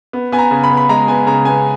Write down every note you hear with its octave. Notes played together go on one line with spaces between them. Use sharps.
B3
B3 G#5
A#5
C#3
B5
B3
B5
G#3 A#5
B3 G#5
C#3 A#5
B3 G#5